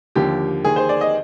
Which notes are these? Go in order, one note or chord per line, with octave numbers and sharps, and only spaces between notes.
D#2 D3 F3 G4
D#2 D#3 G#4
C5
D5
D#5